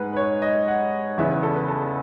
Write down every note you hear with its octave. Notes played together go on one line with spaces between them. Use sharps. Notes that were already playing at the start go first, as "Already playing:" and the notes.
Already playing: G#2 G#3 B4 F#5
B4
C#5
D#5
F#5
E2 C#3 E3 B3 E5
B4
A4
B4
A4